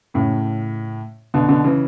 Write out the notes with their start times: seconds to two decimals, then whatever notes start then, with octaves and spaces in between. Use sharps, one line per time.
0.14 A2 C#3
1.34 B2 D3
1.48 B2 D3
1.64 C#3 E3